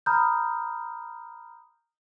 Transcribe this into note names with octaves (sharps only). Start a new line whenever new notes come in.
A#5 B5 D#6 F6 G6